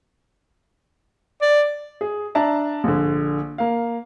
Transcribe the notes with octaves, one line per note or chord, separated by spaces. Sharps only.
D5
G#4
D4 D5 E5 A5 A#5
A#1 D3
A#3 F5